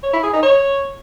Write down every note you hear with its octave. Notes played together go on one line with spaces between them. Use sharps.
C#5
E4
G#4
D#4
C#5